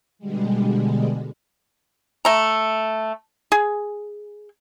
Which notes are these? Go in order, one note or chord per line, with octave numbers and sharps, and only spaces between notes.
B2 D3 G3 G#3
A3 A#5
G#4